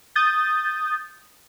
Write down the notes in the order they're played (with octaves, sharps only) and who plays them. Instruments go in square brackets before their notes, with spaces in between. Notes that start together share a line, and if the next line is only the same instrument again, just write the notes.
[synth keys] D#6 G6 A6